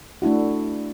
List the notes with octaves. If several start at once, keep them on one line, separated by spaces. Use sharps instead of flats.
A3 D4 E4 F#4